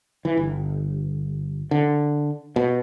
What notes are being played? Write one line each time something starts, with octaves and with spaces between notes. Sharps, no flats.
E3
G1
D3
B2